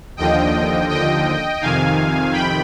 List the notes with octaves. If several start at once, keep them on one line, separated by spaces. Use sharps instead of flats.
D#2 D3 F3 D#5 G5
D#5 G5
F2 C3 D#3 F5 G#5
G5 B5